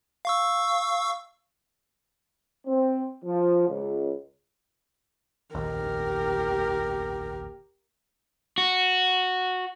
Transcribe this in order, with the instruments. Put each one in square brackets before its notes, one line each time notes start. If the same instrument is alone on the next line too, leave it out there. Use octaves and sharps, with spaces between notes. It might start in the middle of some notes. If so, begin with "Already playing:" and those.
[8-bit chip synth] F5 C#6 E6
[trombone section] C4
F3
C#2
[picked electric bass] F1 A#1 D#2 [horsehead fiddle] G4 A#4
[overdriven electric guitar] F#4